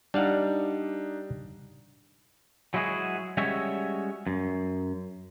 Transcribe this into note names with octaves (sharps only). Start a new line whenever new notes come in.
G3 D4 D#4 F5 F#5
F#3 G#3 E4 F#4 G#4
G3 G#3 C#4 F#4 C#5 E5
F#2